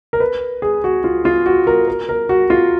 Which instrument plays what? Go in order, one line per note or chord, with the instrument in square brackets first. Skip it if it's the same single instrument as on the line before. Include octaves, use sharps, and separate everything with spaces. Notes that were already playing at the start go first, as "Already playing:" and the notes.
[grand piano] A#4
B4
G#4
F#4
F4
F4
F#4
A#4
A#4
A#4
F#4
F4